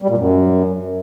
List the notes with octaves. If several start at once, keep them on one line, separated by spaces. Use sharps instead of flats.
G3
A#2
F#2